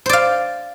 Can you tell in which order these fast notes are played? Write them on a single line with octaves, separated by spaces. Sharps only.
C5 D5 F5